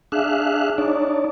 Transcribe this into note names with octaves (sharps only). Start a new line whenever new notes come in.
D4 G#4 E5 F5 F#6
D4 D#4 C#5 D5